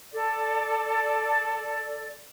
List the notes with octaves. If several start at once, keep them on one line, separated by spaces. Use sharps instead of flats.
A4 D5